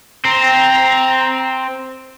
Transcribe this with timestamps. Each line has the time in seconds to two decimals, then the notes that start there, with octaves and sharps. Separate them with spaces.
0.25 C4 A#5